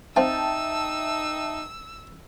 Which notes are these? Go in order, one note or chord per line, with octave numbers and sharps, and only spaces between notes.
C4 D#4 E5 F5 G5 A5 E6